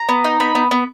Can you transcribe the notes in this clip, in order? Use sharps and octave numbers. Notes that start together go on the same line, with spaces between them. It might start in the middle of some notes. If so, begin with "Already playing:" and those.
Already playing: A#5
B3
D#4
B3 B5
B3
B3